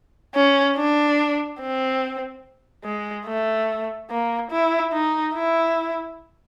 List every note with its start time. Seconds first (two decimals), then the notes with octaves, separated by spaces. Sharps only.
0.35 C#4
0.76 D4
1.61 C4
2.84 G#3
3.26 A3
4.10 A#3
4.51 E4
4.93 D#4
5.34 E4